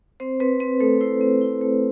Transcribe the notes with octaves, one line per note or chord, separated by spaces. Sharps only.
C4 C5
C4 B4
C4 B4
A3 A4
E4 C5
C4
E4
A3